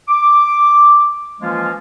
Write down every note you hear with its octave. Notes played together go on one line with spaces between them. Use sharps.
D6
E3 F3 G#3 A#3 C#4 F4